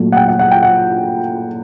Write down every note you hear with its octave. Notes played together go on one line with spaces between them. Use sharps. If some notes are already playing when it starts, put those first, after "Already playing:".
Already playing: A#2 F#3 A3
F#5
G5
F#5
F#5
G5
F#5